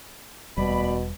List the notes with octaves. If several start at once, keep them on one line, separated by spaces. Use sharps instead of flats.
E1 D2 B2 G3 D5 B5